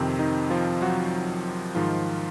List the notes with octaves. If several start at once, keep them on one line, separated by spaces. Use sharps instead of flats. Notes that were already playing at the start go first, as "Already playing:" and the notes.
Already playing: F2 C3 D#3 C4
D#3 D#4
F3 F4
F#3 F#4
G#2 D#3 F3 F4